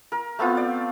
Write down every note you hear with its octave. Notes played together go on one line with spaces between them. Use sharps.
A#4
A3 B3 C4 F4
D5